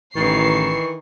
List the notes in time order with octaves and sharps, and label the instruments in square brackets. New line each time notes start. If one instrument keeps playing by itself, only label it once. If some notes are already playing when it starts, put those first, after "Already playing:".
[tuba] A1 [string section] D#3 C7 [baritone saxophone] E3 [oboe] C#6